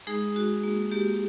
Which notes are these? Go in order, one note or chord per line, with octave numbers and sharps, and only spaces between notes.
G#3 D#4 G#4
F#4
A#3
A#3 G4